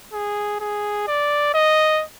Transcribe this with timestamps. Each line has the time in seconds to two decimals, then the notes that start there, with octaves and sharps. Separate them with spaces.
0.13 G#4
0.61 G#4
1.08 D5
1.54 D#5